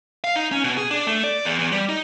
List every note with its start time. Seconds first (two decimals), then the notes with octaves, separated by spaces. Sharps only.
0.24 F5
0.36 D#4
0.52 C#4
0.64 B2
0.77 G#4
0.91 D4
1.07 A3
1.24 D5
1.45 E2
1.59 E2
1.73 G3
1.89 D#4